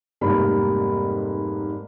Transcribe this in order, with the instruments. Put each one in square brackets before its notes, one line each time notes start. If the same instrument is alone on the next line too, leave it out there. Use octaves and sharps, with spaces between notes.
[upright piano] F1 G#2 G3 A#3 A#4 B5